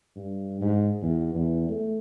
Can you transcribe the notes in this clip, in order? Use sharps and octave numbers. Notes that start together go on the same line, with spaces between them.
G2
G#2
E2
E2
A3